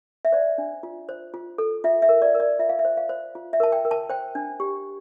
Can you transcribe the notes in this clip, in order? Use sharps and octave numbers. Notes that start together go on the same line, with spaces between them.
E5
C5 D5
D4
F4
C5
F4
A4
F4 E5
E5
A#4
D5
A#4
D5
F4 E5
F5
E5
C5
F5
C5
F4
E5
A#4 A5
G5
A#4
A5
C5 G5
D4
G4